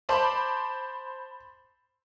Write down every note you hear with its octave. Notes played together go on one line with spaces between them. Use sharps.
C5 A5 B5 D6